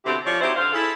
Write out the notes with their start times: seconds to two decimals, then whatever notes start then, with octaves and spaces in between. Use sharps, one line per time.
0.05 B2 D3 C4 E4 G4
0.25 F3 C#5 D5
0.41 F#3 C4 D#4 E4 G4 C5
0.56 D3 C5 F5
0.73 E4 G#4 A4